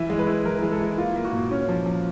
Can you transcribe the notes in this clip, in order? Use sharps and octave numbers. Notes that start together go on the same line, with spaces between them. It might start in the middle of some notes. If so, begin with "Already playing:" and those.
Already playing: E3 E5
G#3
B4
E4
E3 A#4
G#3
A4
E4
A#3 F4
A#3
F#4
A#2
C#4
F3
F3